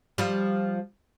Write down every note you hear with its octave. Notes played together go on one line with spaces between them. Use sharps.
F3 G3